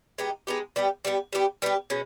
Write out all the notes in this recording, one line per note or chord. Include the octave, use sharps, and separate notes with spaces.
G#3 B3 D#4 G4
G#3 B3 D#4 G4
G3 B3 G4
G3 B3 G4
G3 B3 G4
G3 B3 G4
B2 G#3 C#4